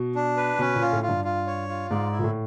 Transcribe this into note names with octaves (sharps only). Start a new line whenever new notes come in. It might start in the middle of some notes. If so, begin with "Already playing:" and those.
Already playing: B2
D4
B4
B2 C#4
A#2
F4
A2
F4
G2
F4
C#5
F4
G#2 D5
E4
A#2
A2